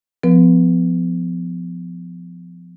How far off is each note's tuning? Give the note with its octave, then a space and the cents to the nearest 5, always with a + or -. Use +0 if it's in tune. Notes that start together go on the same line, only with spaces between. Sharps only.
F3 +0 B3 +30 B4 -25